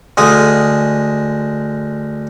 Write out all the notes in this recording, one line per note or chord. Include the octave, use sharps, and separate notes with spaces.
D2 G#3 D#6